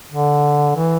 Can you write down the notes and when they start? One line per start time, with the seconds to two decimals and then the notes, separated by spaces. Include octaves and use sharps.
0.12 D3
0.76 E3